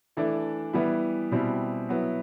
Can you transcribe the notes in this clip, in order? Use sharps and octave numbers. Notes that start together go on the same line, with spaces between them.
E3 A3 D4
E3 G3 B3 E4
B2 G3 C4 E4
F#3 B3 E4